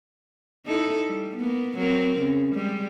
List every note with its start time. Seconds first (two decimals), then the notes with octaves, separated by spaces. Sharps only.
0.66 D#4 E4 A4
1.08 G3
1.36 A#3 B3
1.77 F#3 C4 A#4
2.19 C#3
2.54 G3 G#3